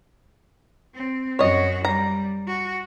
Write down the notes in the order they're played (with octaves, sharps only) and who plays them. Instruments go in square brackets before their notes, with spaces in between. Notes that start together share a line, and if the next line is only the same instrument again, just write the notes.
[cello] C4
[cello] F#2 F#4 [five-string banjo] C#5 D#5
[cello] G3 [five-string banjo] A#5
[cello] F#4